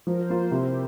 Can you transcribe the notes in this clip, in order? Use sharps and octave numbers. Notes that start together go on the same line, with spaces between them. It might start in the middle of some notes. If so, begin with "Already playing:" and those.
F3 A#4
C5
A#3 F4
C5
C3 E4
G4